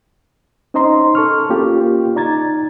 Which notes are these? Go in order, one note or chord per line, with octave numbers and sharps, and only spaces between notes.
C#4 D#4 C5 D#5 A#5 C6
A4 C#6 F6
A#3 C#4 F4 G4
D#4 D5 A#5 G#6 A6